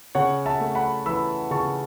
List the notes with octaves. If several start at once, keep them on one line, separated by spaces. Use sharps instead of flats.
C#3 C#5 F#5
E5 A5
A3
F#5 B5
E3 B5 E6
C#3 A5 C#6